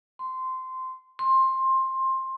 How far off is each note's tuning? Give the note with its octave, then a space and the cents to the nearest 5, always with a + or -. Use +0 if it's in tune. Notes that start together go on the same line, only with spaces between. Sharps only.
C6 -15
C6 +15